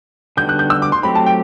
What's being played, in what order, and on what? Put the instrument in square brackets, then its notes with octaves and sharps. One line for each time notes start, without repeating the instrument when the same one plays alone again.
[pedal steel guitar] D3 G3 B3 F#4 [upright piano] G6
[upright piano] F#6
G6
E6
D6
C6
[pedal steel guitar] F#3 A3 C4 G4 [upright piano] B5
[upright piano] A5
G5